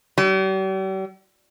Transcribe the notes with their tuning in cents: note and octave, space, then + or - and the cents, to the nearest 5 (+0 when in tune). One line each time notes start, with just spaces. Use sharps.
G3 -45